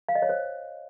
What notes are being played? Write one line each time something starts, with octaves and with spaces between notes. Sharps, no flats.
F5
D#5
C#5
C5